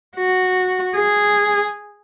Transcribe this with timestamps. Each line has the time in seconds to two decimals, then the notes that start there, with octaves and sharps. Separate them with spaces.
0.16 F#4
0.95 G#4